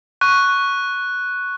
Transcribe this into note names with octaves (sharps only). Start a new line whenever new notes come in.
C#6 F#6